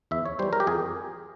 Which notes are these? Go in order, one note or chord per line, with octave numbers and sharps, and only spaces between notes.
E2 E5
C#5
E3 G3 C5
A#4
G4
F2 G#4